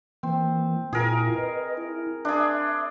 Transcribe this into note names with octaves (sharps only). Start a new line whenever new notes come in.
E3 A#3 C4
A#2 E4 F4 G#4 A#4
B4 D#5
E4
D4 G#4 E5 C6